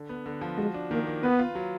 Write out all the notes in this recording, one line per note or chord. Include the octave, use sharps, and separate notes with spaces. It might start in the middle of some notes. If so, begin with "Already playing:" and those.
Already playing: D3
B3
D3
F3
G#3 F#4
D4
D#3 A#3
A#3
B3 B4
F4
F#3